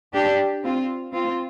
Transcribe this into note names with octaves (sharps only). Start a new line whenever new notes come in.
D4 G4
C4 F4
C4 F4